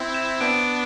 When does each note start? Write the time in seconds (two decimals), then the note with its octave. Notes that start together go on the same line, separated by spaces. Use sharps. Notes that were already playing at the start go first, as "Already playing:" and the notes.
Already playing: C4 E4
0.14 E7
0.41 B3 D4 D7